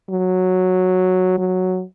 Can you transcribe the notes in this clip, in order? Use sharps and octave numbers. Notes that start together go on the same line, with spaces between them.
F#3
F#3